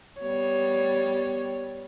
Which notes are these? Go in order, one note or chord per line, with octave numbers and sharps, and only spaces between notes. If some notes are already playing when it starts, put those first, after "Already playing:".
G3 B3 C#5